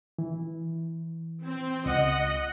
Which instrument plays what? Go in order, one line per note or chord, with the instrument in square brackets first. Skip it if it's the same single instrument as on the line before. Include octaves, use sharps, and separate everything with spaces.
[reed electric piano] E3
[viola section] C4
[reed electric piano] C#2 [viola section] D#5 F#5